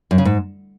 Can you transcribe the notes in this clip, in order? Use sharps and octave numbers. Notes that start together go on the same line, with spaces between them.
F#2
C#3
G#2